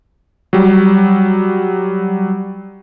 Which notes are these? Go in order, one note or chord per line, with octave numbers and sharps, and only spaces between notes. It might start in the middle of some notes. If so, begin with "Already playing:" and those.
F#3 G3